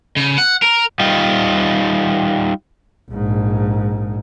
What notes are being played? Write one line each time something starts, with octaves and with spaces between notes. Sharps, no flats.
C#3
F#5
A#4
G3 D#4 F4
A#1 G#2